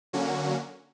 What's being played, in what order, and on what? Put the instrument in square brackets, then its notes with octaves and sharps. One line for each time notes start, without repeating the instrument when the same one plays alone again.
[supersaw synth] D3 F#3 A#3 C#4 F#4